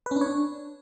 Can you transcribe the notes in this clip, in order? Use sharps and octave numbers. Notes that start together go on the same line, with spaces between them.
B4
C#4
D4
C#5
D4